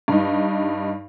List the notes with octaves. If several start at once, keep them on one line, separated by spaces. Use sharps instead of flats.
G2 D#4